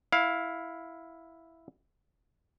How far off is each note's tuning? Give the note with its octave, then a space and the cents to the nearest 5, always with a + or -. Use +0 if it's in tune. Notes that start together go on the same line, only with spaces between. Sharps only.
E4 +0 F5 +15